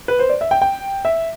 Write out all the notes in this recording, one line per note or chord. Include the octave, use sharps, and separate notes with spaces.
B4
C5
D5
E5
G5
G5
E5